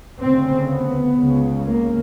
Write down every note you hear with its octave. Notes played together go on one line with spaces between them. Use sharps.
D2 C#3 C4
B3
C#2 C#3
A#3